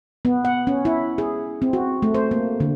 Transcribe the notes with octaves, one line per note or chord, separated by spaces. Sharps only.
B3
F#5
C#4
E4
G#4
C4
F#4
A3
C5
A#3
D3